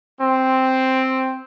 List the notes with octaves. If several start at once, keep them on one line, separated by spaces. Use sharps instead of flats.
C4